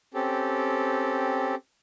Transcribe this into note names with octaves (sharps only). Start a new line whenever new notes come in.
C4 C#4 G4 A4